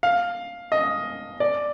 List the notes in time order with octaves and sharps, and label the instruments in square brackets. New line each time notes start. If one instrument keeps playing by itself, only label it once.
[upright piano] F5
D#5
D5